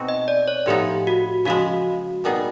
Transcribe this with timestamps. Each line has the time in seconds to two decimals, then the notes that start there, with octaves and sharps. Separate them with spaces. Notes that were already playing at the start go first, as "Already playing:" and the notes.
Already playing: B2 G#3 C4 D#4 F#4
0.09 D#5
0.28 D5
0.48 C#5
0.66 A2 F3 G#3 B3 D#4 G4
1.07 F#4
1.45 C#3 F3 G#3 F#4
2.24 A#2 G3 B3 D#4 G#4